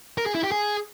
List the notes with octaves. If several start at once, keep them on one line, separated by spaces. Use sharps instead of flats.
A#4
G#4
E4
G4
G#4